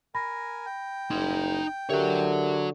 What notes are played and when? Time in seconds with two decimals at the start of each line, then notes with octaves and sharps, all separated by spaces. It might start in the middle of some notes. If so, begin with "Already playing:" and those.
0.15 A#4 G#5 B5 A#6
0.66 G5
1.11 F#1 D#4 C6
1.90 D3 F#4 G4 A#4 C#5 E5